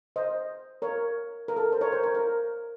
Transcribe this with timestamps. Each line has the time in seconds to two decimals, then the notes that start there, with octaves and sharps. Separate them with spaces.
0.16 C5 D#5
0.82 A#4 C#5
1.48 A#4
1.56 A4
1.73 C5
1.81 A#4 C#5
1.92 C5
2.03 A#4
2.14 A#4